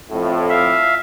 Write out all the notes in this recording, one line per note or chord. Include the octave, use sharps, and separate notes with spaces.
F2 A2
E5 F5